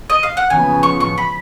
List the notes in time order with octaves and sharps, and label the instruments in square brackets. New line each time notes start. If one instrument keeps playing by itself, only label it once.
[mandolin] D#5
F5
F#5
[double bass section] C#3 F3 B3 [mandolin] G#5
[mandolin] C#6
C#6
B5